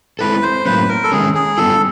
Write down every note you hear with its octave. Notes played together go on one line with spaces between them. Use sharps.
G#3 C4 E4 A4 B4
C5
A2 F#3 A#3 C#4 B4
A#4
A4
D#3 G#3 C#4 G#4
G#4
G3 B3 D4 F4 A4